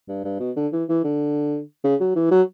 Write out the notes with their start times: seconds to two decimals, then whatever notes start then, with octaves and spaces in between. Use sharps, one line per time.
0.08 G2
0.24 G2
0.40 B2
0.56 D3
0.73 E3
0.89 E3
1.04 D3
1.84 C#3
2.00 F#3
2.16 E3
2.31 F#3